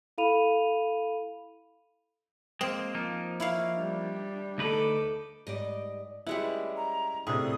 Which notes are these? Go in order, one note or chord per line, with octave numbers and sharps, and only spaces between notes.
E4 A4 F5 B5 D#7 F7
G#3 A#3 C4
F3 A#3 D#4
E4 C#5 F5
G3 D4
D2 D#4 A4 B4 D6
G#2 G3 D5 D#5
G3 G#3 C#4 E4 B4 F#5
A#5
A2 C3 D4 G#4 D#6